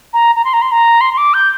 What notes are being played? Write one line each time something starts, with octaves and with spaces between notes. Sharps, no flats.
A#5
A#5
C6
A#5
C6
A#5
C6
C6
D6
G6